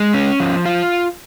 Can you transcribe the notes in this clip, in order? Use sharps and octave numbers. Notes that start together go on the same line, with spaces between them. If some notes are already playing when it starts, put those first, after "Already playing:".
Already playing: G#3
C#4
F3
F4